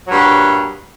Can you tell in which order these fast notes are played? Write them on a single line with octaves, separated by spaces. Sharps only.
F#3 G2 A#2